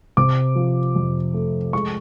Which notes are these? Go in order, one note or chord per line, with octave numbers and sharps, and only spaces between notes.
C3 D6
F3
F2
A3
G#3 C#6